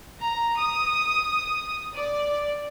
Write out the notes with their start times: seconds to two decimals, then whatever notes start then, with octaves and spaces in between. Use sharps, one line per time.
0.20 A#5
0.57 D#6
1.94 D5